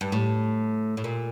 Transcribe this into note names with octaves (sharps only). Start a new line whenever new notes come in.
G2
A2
A2
A#2